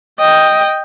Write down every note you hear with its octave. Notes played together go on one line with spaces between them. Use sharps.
D#5 G5